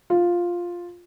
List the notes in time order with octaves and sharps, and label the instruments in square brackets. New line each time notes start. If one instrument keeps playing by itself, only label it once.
[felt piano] F4